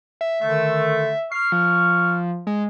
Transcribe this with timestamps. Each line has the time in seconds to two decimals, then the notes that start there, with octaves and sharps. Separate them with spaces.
0.21 E5
0.42 D3 D#3 A3 E5
1.32 C#6 F6 C7
1.52 F3
2.47 G#3